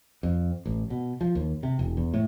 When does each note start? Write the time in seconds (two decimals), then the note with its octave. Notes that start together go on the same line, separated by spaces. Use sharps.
0.23 F2
0.66 A1
0.90 B2
1.21 F3
1.35 D#2
1.63 C3
1.79 E1
1.97 E2
2.14 A2